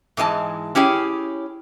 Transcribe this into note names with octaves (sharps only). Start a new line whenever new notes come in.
G#2 E3 G#3 A5
C#4 E4 G4 G#4 C#5